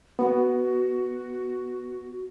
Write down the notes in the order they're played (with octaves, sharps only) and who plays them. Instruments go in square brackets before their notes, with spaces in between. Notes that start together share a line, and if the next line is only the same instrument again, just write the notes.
[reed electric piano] B3 [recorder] F#4